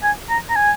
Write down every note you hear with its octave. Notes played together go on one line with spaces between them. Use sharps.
G#5
A#5
A#5
G#5